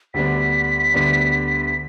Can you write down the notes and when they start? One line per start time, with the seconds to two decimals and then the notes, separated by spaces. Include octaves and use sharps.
0.14 D2 D3 G3 B3 D4 B6
0.94 D2 D3 G3 B3 D4